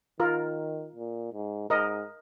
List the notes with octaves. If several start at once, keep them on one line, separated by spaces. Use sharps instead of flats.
D#3 F4 A#4
A#2
G#2
G#2 A#4 D#5